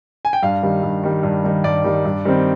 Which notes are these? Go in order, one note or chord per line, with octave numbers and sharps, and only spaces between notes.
G#5
G5
G2 F5
D#3 G3
G2
D#3 G3
G2
D#3 G3
G2 D5
D#3 G3
G2
D#3 G3 C4